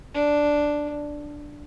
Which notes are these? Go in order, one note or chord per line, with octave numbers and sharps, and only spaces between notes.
D4